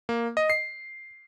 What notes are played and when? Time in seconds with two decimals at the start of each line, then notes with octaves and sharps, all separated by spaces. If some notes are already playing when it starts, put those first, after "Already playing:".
0.09 A#3
0.37 D#5
0.50 C7